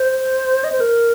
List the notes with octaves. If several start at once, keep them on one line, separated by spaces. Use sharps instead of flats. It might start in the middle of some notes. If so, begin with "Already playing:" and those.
Already playing: C5
D#5
C5
A#4